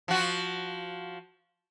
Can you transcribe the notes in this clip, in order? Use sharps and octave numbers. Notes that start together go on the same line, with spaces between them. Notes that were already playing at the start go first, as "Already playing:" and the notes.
F3 F#4